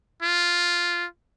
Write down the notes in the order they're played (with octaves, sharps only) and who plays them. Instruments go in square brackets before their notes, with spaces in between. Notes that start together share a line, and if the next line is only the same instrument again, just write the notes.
[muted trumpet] F4